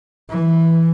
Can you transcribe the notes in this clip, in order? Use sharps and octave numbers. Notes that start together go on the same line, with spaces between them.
E3